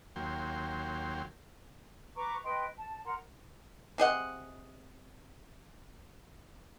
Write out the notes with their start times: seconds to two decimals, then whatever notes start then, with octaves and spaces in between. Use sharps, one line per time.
0.16 D#2 F#3 A#3 G5 C6
2.16 B4 A#5 C#6 D6
2.44 B4 D#5 G5 C6
2.77 A5
3.04 A#4 F#5 A#5 C6
3.98 C3 G#4 D#5 F#5